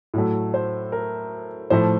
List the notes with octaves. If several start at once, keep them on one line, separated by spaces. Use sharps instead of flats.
A2 F#3 A3
C5
A#4
A2 F3 A3 C5